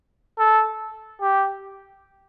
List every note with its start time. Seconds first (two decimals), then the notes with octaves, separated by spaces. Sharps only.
0.39 A4
1.21 G4